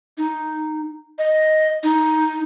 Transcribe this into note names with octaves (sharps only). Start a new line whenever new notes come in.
D#4
D#5
D#4